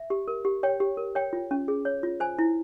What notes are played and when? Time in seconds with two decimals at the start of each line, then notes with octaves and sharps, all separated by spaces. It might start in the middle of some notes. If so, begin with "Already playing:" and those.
Already playing: E5
0.10 G4
0.28 A#4
0.45 G4
0.63 C#5 G5
0.80 G4
0.97 A#4
1.15 C#5 G5
1.33 F4
1.51 C#4
1.68 G#4
1.85 C#5
2.03 F4
2.20 C5 G#5
2.39 E4